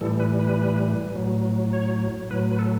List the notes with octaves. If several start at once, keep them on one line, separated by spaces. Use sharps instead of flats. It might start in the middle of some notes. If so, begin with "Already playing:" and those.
A2 E3 G3 A4
B4
B4
A2 F#3
C#5
A2 F#3 B4
B4
A4